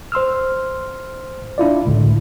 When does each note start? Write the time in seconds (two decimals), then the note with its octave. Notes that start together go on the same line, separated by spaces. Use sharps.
0.12 C5 C6 E6 F6
1.58 D4 E4 F4 D5
1.85 G#1 C#2 A2 D3